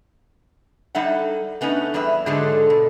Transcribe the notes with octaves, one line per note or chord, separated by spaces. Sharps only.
G3 D#4 A4 E5 F#5
A3 B3 C#4 D#4
E2 G3 G#4 B4 E5
G#2 D3 F#3 G#3 G#4 A4
B2